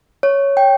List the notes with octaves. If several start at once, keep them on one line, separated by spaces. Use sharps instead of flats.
C#5
G5